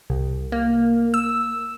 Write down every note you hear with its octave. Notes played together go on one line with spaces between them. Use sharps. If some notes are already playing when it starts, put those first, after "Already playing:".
C2
A#3
E6